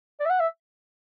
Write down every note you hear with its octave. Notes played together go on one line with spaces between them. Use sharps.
D5
E5
F#5
E5